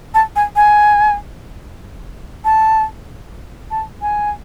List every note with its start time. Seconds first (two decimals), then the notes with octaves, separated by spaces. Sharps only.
0.14 A5
0.36 G#5
0.56 G#5
2.45 A5
3.71 A5
4.02 G#5